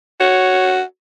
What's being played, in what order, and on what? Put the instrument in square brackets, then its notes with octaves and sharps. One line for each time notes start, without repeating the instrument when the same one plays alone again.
[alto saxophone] F#4 [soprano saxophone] C#5